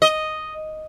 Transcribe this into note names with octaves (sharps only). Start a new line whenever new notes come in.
D#5